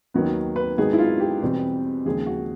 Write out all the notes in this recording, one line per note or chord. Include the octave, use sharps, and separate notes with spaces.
D#2 D#3 F#3 B3
B4
G#2 D#3 F#3 B3 G#4
E4
F4
G4
E2 B2 G3 C4
D#2 C#3 F3 G#3 G#4
F#4